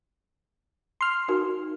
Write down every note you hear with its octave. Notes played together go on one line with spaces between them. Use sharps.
C6 F6
D#4 F#4 A#4